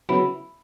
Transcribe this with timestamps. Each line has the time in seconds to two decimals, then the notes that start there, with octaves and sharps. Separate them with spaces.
0.09 C#3 F#3 B3 E4